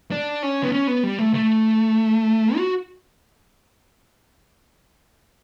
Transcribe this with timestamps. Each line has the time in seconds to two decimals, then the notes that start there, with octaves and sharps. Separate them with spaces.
0.11 D4
0.43 C#4
0.63 B3
0.72 C#4
0.87 B3
1.03 G3
1.18 A3
1.34 A3
2.57 F#4